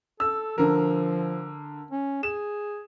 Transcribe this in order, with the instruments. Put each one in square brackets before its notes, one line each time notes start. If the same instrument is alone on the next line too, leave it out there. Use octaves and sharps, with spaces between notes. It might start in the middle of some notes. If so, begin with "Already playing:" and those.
[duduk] A4 [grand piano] E6
[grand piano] D3 A#4 [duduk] F3
[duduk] C#4
[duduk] G#4 [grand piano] E7